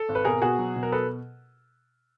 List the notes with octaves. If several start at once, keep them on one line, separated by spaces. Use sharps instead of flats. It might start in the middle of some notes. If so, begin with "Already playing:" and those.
Already playing: A4
G#1
B4
B2 G#4 A#4
B2 F#4 G#4
F#3
B2
A#4
A4 B4